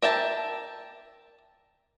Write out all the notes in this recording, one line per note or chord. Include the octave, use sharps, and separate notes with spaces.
A#4 E5 G5 A5